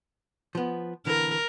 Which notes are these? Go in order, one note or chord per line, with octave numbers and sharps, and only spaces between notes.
F3 B3
D3 E3 A#4